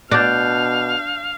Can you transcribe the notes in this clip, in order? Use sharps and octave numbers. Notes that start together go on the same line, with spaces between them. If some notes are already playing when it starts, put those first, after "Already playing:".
B2 D4 F5 F#6 G6